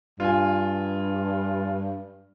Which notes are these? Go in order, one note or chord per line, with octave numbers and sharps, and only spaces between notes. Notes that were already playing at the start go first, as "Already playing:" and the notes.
G2 F4 G#5